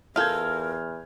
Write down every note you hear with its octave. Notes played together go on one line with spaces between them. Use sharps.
E2 F4 A4 A#4 F6 G6 G#6